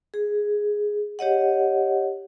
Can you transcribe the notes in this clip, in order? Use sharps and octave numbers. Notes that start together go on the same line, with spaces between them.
G#4
G4 C#5 D#5 F#5